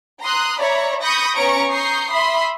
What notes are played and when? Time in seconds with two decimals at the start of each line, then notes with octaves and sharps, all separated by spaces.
0.22 A#5 C6 D#6 F#6
0.61 C#5 D5 E5 A#5 B5
1.02 B5 C#6 D#6 G6 A#6 C#7
1.35 B3 C#4 A#5 C#6 D7
1.72 A#5 C#6 D#6 G6 C7
2.11 E5 B5 C6 D#6